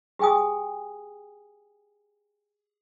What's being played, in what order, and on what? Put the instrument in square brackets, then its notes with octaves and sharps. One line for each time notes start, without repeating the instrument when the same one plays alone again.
[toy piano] G4 G#4 G5 G#5 D#6